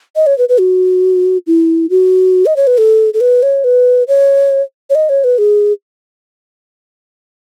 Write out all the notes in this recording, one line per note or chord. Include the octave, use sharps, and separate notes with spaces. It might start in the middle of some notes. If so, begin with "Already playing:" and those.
D#5
C#5
B4
B4
F#4
E4
F#4
D#5
C#5
B4
A4
A4
B4
C#5
B4
C#5
C#5
D#5
C#5
B4
G#4